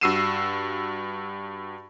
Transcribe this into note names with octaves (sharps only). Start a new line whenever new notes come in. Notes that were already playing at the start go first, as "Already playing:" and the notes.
G2 F#4 E6 C7 D#7 E7